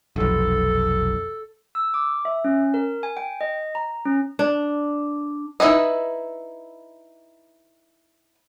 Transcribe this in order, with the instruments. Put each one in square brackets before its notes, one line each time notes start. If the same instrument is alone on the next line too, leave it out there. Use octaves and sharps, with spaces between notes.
[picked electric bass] F1 B1 [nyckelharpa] A4
[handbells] E6
D6
E5
C#4
A#4
G#5
G5
D#5
A#5
C#4
[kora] D4
[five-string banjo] D#4 E4 B4 D#5